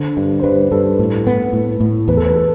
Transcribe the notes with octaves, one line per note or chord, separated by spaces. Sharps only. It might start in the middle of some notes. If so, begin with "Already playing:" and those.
Already playing: D3 C5
G2
C5
G2 B4
G2 A4
A2
B3
A2
A2
E2 B4
A4
B4
A4